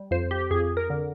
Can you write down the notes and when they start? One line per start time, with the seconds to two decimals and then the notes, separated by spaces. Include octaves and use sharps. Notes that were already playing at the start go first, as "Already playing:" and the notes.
Already playing: G3
0.11 F2 C5
0.31 G4
0.51 F2 G#4
0.77 A#4
0.90 D3